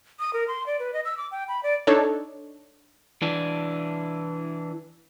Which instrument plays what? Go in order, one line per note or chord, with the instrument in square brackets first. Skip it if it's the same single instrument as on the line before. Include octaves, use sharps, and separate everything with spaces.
[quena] D#6
A#4
C6
D5
B4
D#5
E6
D6
G5
B5
D5
[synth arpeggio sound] D4 D#4 A4 C#5
[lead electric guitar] E3 D4